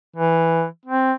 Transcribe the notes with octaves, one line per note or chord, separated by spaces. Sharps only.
E3
C4